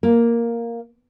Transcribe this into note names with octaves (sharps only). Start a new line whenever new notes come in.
A#3